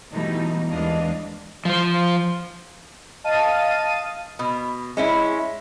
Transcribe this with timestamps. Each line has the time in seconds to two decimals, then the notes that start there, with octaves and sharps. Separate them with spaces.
0.12 B2 E3 G3 A3 D#4
0.70 D#2 E3 G#3 D4 D#5 F5
1.65 F3 C5
3.24 D#5 F5 A5 A6 D#7
4.39 B2
4.97 G#3 C#4 E4